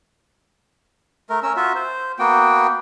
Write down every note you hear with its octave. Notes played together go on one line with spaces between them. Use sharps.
A3 A#4
C#4 A#4 E6
F4 F#4 E5
C5
A#3 B3 F#4 G5